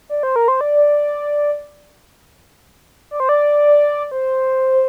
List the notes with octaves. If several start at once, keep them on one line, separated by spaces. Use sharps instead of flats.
D5
C5
A#4
C5
D5
D5
C5
D5
C5